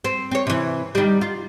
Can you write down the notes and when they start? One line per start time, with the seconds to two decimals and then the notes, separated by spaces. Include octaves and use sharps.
0.04 C4
0.31 C4 C#5
0.47 C3 E3
0.95 D#3 G3
1.21 F4